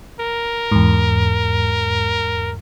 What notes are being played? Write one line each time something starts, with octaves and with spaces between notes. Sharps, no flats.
A#4
E2 G#2